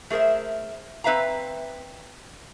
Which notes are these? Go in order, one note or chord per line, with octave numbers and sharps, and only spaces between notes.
A3 G#4 A#4 C5 E5
C4 B4 E5 F5 A#5